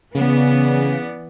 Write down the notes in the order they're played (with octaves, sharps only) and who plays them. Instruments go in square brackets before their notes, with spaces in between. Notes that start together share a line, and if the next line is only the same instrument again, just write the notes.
[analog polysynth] C#3 [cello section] E3 B3 D5